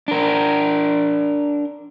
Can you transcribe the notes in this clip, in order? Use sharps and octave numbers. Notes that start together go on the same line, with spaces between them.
D4 A#4